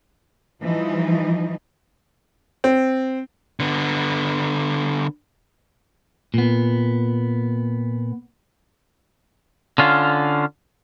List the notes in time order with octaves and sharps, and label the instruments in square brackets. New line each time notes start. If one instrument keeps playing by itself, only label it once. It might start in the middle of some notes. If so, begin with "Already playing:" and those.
[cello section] E3 F3 G3 D#4
[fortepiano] C4
[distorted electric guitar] D3 B3
[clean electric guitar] A#2 B3
D3 C#4 F4